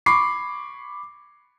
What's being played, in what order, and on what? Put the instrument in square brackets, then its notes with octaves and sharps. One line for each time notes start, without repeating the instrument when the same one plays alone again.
[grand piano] B5 C#6 D6 C7